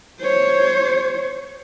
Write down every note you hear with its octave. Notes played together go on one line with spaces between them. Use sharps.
C5 C#5